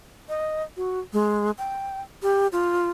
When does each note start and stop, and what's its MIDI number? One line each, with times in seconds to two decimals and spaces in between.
0.29 0.63 75
0.77 0.99 66
1.13 1.51 56
1.58 2.01 79
2.23 2.47 67
2.52 2.91 65